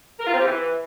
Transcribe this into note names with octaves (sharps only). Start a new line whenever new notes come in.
A#4
F4
C4
G4
E3